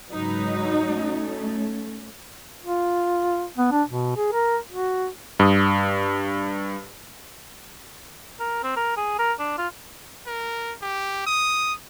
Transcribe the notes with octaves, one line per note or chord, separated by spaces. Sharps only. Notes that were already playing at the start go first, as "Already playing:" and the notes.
G#2 C#3 F#3 D#4 B4
A3 C#4
F4
B3
D4
B2
G#4
A#4
F#4
G2 D#6
A#4
C4
A#4
G#4
A#4
D4
F4
A#4
G4
D#6